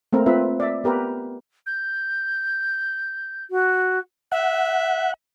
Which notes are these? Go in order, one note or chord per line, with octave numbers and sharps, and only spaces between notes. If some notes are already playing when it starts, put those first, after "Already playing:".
A3 A#3 C4 A#4
C4 F4 B4 E5
D5 E5
B3 G4 A#4 B4
G6
F#4
E5 F#5